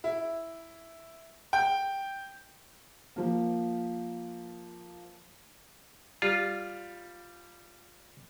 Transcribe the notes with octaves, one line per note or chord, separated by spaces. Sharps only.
E4
G5
F3 A#3
G3 F4